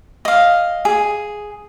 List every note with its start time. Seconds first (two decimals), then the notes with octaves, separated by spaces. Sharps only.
0.25 D#5 F5
0.85 G#4